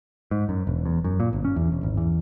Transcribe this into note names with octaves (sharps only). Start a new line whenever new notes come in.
G#2
F#2
E1
E2
F#2
A#2
G1
C#4
E2
E1
G#1
E2